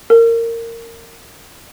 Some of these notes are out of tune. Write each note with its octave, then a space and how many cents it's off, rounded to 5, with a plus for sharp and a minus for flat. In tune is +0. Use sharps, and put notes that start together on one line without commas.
A#4 -20